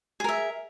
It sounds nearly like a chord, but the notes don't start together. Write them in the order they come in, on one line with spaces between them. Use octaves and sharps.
G#4 A#4 E5